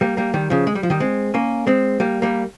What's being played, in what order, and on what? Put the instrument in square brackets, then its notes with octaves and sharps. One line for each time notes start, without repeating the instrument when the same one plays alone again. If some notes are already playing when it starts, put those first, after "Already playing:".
[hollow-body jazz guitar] G3 A#3
G3 A#3
D#3 G3
C#3 F3
G#3
G3
F3
D#3 G3
G#3 C4
A#3 C#4
G#3 C4
G3 A#3
G3 A#3